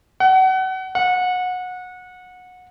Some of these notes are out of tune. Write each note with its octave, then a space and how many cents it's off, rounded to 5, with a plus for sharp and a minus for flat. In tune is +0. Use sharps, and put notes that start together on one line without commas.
F#5 +30
F#5 -25